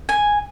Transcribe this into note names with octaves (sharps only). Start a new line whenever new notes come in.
G#5